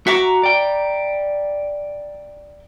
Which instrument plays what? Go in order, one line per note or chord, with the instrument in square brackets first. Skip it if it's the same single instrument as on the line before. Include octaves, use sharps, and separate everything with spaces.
[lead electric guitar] F#4 [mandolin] E5 A#5 D6
[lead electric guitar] D5 G5